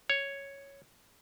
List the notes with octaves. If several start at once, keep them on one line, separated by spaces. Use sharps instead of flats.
C#5